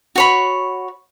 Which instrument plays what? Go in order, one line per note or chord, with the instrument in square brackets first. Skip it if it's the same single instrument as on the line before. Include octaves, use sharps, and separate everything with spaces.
[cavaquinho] F#4 C#5 B5